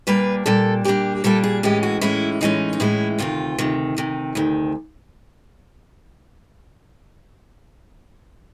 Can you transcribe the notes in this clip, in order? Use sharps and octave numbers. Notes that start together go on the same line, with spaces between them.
A#2 G3 A#3 D4 B4
A#2 G3 A#3 D4 A4
A#2 G3 A#3 D4 G4
A#2 G3 A#3 D4 A4
G#4
A2 E3 G#3 C#4 G4
F#4
A2 E3 G#3 C#4 E4
A2 E3 G#3 C#4 D#4
D#4
A2 E3 G#3 C#4 E4
D2 C3 D#3 F4
D2 C3 D#3
D2 C3 D#3
D2 C3 D#3